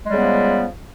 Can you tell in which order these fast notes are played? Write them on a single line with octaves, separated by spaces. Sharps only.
G#3 G3 C#3 B3 F3